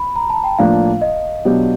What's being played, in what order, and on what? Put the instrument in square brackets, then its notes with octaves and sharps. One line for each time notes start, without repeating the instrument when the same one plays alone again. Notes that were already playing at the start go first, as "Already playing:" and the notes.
Already playing: [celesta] B5
A#5
A5
G5
[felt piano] A2 F3 A#3 D4 [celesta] F5
[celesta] D#5
[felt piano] B2 F#3 B3 D4 G4